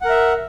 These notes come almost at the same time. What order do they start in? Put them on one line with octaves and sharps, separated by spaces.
F#5 A#4 E5